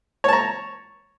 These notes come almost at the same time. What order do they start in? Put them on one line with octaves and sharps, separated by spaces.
C#5 A5 A#5